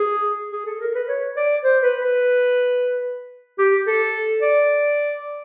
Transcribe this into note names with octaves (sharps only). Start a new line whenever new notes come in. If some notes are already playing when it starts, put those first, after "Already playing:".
Already playing: G#4
G#4
A4
A#4
B4
C#5
D5
C5
B4
B4
G4
A4
D5